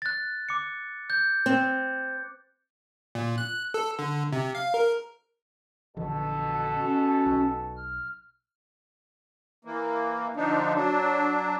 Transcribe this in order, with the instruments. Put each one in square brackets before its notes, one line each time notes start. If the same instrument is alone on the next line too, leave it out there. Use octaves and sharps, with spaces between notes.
[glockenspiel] F#6 A6
D6 C#7
G6
[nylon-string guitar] C4
[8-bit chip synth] A#2
F#6
A4
D3
C3
F5
A#4
[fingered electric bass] A#1 D3 E3 [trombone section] B2 A4
[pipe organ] C#4 F#4
[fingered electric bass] B1
[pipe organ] F6
[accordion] E3 A#3
D3 F3 D4 D#4
F#3 D4